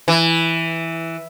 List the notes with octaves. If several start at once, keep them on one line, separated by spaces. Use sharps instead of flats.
E3